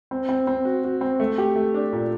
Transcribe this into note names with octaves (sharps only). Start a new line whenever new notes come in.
C4
C4
C4
F#4
F#4
C4
A3
G4
A3
D4
A#2